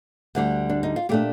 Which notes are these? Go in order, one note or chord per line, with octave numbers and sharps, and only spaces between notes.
D2 D3 G3
D4
D#4
F4
A#2 A3 D4 G4